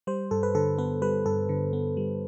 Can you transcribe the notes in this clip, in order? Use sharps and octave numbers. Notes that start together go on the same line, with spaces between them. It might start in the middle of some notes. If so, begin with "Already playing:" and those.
G3 C5
G2 A4
B4
D3 A4
B3 B4
G3 B4
G2 A4
D3
B3
G3